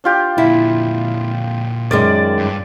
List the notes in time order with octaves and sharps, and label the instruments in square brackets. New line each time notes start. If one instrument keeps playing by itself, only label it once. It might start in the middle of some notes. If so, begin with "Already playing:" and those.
[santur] D4 F4 G4
[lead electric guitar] A#2 D3 [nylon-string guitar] E4
[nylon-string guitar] F#2 D#3 G#3 [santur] D5
[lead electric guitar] G2